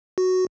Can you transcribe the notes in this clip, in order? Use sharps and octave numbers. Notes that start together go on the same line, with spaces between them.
F#4